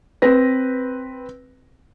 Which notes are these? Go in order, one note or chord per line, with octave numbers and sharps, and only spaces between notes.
C4 B4 A#6